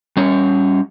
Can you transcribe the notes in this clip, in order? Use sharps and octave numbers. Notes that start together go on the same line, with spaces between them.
G3 C#4 C#5